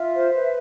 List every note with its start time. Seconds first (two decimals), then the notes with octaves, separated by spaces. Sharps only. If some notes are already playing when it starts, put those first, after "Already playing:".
Already playing: F4 E5
0.13 C5
0.33 B4